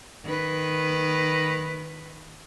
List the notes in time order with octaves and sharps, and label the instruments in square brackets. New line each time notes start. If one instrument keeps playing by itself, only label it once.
[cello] D#3 B4